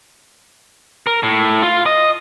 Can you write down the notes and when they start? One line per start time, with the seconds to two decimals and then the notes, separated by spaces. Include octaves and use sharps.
1.07 A#4
1.23 A2
1.63 F4
1.86 D#5